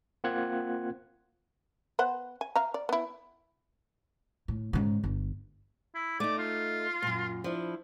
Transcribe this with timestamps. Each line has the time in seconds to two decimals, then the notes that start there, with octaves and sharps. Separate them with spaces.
0.24 A#3 C4 F4 F#5 F#6 G#6
1.99 B3 C5 F#5
2.41 G#5
2.56 E5 F5 A#5
2.74 D5
2.89 B3 E4
4.48 A2
4.73 G#2 C#3
5.04 G1
5.95 E4
6.20 A3 D#4 D5
6.38 F4
7.02 F#2 A#2
7.44 F3 D4 E4